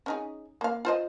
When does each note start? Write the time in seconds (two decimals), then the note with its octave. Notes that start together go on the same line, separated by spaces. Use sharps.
0.06 C#4 D#4 G#4
0.61 A#3 F5
0.85 F4 C5 D#5